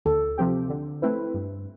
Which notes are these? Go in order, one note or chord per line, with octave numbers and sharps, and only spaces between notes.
D2 A4
C3 F3 C4 G4
D3
A3 C4 E4 B4
G2